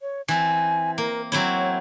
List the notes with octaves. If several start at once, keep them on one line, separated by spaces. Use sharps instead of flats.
C#5
E3 C4 G#5
A#3 A#4
F#3 C4 E4 C#5